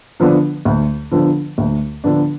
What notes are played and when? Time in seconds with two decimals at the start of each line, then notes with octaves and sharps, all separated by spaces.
0.20 D3 F3 B3 D4
0.65 D2
1.12 D3 F3 B3 D4
1.58 D2
2.04 D3 F3 B3 D4